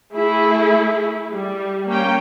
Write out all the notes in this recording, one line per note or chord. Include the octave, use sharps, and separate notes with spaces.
A3 E4 G#4
G3
A#3 C#4 G5